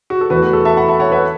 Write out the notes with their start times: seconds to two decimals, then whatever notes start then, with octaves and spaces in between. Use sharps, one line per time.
0.10 F#4
0.21 A4
0.30 E2 E3 A3 F#4 B4
0.43 F#4
0.53 A4
0.65 E5 A5
0.77 F#5 B5
0.88 E5 A5
1.00 C#5 F#5
1.11 B4 E5